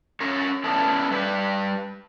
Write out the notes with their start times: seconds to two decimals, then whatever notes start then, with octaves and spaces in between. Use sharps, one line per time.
0.20 C#4 A#4 C#5
0.64 B3 C#4 D4 E4 A4
1.11 G3 B4